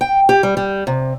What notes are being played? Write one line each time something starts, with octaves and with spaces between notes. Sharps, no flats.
G5
G4
G3
G3
C3